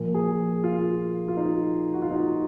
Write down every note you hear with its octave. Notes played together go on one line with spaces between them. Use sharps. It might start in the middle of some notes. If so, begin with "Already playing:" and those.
Already playing: A#2 F3 A#3
G#4
F4
F4
D#4
F#4
F4
D#4